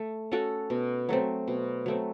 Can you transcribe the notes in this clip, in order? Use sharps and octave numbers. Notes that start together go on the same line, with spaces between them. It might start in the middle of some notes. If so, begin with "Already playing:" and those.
Already playing: A3
C#4 F#4 A4
B2
F#3 A3 C4
B2
F#3 A3 C4